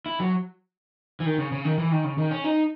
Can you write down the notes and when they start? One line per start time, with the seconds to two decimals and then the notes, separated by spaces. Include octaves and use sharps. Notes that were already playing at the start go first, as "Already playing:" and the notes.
0.06 E4
0.20 F#3
1.20 E3
1.26 D#3
1.38 C#3
1.52 C#3
1.65 D#3
1.78 E3
1.91 D#3
2.04 C#3
2.18 D#3
2.31 C#4
2.44 D#4